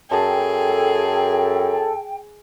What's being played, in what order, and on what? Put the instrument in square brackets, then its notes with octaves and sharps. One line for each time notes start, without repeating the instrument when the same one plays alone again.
[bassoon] F#2 [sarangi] G#4 [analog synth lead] A4 [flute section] G5